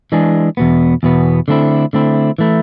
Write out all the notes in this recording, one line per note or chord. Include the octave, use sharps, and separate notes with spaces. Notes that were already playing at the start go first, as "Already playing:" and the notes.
E3 G#3 D4 G#4
E2 B2 B3
E2 B2 B3
D3 A3 C4 E4
D3 A3 C4 E4
E3 A3 E4